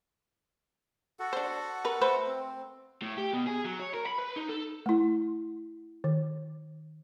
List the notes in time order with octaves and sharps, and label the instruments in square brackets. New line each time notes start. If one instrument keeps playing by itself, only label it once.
[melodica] F#4 A4 F#5
[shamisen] D4 C5
A#4 B4
A3 B4 C5
[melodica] C4
[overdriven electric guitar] A2
G4
B2
G#4
F#3
C#5
A#4
B5
B4
D#4
A4
[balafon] A3 E4
D#3